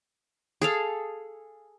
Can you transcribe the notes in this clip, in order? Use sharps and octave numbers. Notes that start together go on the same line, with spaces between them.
G#4 A4 F5